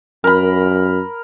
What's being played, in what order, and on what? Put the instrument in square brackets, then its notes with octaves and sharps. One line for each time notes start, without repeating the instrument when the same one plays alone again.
[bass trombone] F#2 [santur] A#4 B5